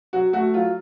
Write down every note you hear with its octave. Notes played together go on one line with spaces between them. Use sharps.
F#3 F#4
A3 F#4
F#3 F4